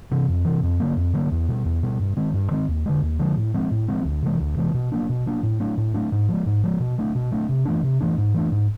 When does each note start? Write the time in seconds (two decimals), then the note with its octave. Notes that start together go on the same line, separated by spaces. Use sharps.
0.11 C3 E3
0.28 F2
0.45 C3 E3
0.63 F2
0.80 D3 F#3 A#3
0.96 F2
1.13 D3 F#3 A#3
1.31 E2
1.48 B2 G3
1.65 E2
1.83 B2 G3
1.99 G2
2.17 D#3 G#3 C4
2.33 G2
2.51 D#3 G#3 C4
2.68 D#2
2.86 D3 F3 G#3
3.02 D#2
3.19 D3 F3 G#3
3.37 A2
3.54 F3 G#3 C4
3.71 A2
3.88 F3 G#3 C4
4.05 D2
4.22 C3 E3 G#3
4.40 D2
4.57 C3 E3 G#3
4.74 B2
4.92 F#3 A#3 D4
5.09 B2
5.26 F#3 A#3 D4
5.43 A2
5.60 F#3 A3 D4
5.77 A2
5.94 F#3 A3 D4
6.12 G#2
6.28 F3 G#3
6.46 G#2
6.64 F3 G#3
6.80 B2
6.98 F#3 A3 D4
7.15 B2
7.31 F#3 A3 D4
7.49 C3
7.65 E3 A3 D4
7.83 C3
8.01 E3 A3 D4
8.18 G#2
8.34 E3 A3 D4
8.52 G#2